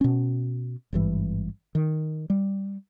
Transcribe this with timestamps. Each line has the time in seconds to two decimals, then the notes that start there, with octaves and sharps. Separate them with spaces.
0.01 B2 C#4
0.93 G#1 G2 E3
1.75 D#3
2.30 G3